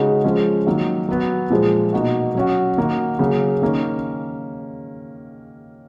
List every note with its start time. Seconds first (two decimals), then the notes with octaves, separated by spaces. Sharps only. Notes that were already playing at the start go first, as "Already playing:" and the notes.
Already playing: C#3 G#3 D#4 F#4
0.24 F3 G#3 C#4
0.67 D#3 F#3 A#3
1.09 F#3 B3 F#4
1.50 A#2 F3 G#3
1.93 B2 A#3 D#4 F#4
2.35 F#3 C#4 F#4
2.77 D#3 A#3 D#4 F#4
3.19 C#3 F#3 A#3
3.62 D#3 A#3 C#4